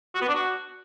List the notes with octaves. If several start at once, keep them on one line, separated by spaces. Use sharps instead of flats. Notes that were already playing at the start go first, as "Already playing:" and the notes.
F#4
B3
D4
F#4